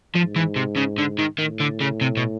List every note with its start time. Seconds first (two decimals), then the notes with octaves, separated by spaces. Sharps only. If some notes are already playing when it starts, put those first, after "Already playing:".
0.15 G#2 F3
0.36 E3
0.56 C3
0.77 C#3
0.98 D3
1.19 D#3
1.39 A2 D#3
1.60 D3
1.81 C#3
2.01 C3
2.17 B2